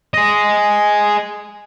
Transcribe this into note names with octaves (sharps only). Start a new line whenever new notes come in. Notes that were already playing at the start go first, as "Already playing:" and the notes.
G#4 D#5